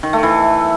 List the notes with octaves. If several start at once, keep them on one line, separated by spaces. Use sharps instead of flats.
D#3
A3
E3